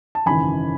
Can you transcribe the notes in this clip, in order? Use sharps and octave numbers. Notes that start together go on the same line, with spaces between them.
A5
G#1 F#2 C#3 E3 G#5 B5